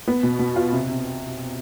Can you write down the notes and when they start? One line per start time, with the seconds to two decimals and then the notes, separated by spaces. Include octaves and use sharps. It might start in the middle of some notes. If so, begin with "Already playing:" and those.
0.08 B3
0.23 B2
0.39 B2
0.56 F4
0.72 C3
0.89 C3